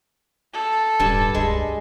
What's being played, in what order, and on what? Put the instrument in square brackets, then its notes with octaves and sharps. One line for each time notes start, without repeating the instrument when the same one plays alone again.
[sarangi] A4
[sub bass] D1 [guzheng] G2 A5
[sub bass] C#2 [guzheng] G#3